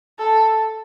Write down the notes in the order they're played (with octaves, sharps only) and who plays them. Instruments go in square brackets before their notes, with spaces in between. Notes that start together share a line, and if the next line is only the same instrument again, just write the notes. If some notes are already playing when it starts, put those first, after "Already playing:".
[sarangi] A4